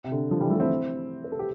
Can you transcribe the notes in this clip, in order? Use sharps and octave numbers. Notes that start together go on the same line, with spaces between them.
C3
D3
D3 F3
E3 G3
F3 A3
C4 E4
B4
A4
G4